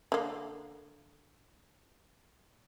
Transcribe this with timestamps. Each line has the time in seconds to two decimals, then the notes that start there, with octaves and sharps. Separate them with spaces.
0.12 D3 A#3